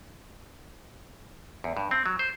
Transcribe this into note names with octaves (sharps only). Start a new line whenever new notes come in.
E2
G2
C4
F#3
C5